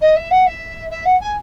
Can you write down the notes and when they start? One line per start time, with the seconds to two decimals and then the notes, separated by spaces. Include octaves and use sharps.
0.01 D#5
0.15 E5
0.30 F#5
0.46 E5
0.90 E5
1.05 F#5
1.20 G#5